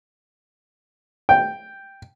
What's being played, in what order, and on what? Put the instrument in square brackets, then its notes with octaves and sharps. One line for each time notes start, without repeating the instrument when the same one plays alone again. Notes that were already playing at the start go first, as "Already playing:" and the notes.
[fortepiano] G5